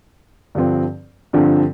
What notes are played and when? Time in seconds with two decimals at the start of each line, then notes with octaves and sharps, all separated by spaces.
0.55 G2 D3 F3 C4
1.33 G2 D3 F3 C4